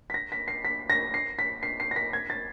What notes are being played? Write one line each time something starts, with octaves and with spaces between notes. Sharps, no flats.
B6
A#6
B6
C7
B6
A#6
C7
B6
C7
C7
A#6
B6
G#6
A6